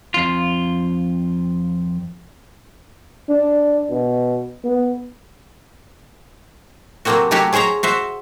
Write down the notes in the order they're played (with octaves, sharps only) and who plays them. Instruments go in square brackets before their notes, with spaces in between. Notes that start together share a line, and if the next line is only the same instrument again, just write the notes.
[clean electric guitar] F2 F4
[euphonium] D4
B2
B3
[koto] C3 F#3 A3 A#3 C4 F#4
F#3 A3 C#4 F#4 G4 C#5
C#4 G#4 C5 C#5 A#5
F#4 C5 E5